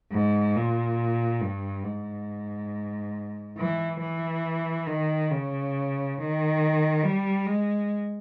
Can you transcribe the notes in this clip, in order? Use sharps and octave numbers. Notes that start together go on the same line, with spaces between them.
G#2
A#2
G2
G#2
E3
E3
D#3
C#3
D#3
G3
G#3